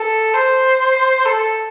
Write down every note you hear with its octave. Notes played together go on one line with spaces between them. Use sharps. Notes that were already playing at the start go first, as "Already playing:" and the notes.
Already playing: A4
C5
A4